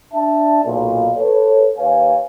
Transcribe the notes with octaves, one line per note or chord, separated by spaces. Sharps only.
D4 E5 A5
B1 A#2
A4 B4 C#5
D#2 B4 C#5 F5 G#5